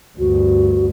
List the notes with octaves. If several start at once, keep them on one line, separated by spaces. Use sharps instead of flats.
D2 G2 F#4